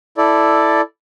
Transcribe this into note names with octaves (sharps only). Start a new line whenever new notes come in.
E4 A4 D5